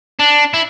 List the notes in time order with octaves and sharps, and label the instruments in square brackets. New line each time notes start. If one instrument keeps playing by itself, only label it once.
[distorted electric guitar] D4
E4